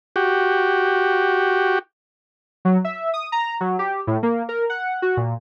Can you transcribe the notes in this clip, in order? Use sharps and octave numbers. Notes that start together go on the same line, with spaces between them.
F#4 G4
F#3
E5
D#6
A#5
F#3
G4
A2
A#3
A#4
F#5
F#4
A#2